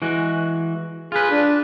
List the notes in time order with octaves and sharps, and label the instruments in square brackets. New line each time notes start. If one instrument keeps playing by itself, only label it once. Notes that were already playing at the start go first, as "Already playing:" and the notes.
[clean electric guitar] E3 G#3 F#4
[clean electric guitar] F4 B4 [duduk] G#4
[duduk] D4